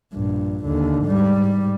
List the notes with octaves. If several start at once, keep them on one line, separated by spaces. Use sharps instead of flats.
A#1 G2
D#2 D3
G#2 G3